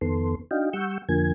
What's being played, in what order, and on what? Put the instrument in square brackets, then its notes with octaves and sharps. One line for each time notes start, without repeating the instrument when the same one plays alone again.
[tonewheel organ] F2 D#3 B3 A4 C6
D4 D#4 F#4 D#5 F5 G5
G3 F#5 C#6 E6 G6
F2 D3 F3 A#3 G#5 G#6